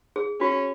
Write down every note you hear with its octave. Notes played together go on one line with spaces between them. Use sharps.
G#4
C#4 F#4